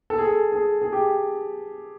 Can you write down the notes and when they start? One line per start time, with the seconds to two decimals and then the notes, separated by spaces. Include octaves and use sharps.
0.10 A4
0.18 G#4
0.25 A4
0.52 G#4
0.82 G#4
0.93 G4